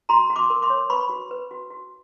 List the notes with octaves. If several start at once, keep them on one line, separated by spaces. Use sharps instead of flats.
F#4 A#5 C6
F#4
C6 D6
A#4
C6 D6
C#5
B4 B5 C#6
F#4
B4
F#4
F#4